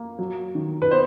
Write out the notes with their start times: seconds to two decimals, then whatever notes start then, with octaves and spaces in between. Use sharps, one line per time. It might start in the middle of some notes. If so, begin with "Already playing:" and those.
Already playing: A#3
0.19 F#3
0.55 D#3
0.82 B4
0.91 B3 C5